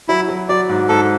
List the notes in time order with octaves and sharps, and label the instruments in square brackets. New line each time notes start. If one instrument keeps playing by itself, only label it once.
[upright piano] F#3 [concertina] E4
[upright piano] F#3
[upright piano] F#3 [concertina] D5
[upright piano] G#2
[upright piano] G#2 [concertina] A4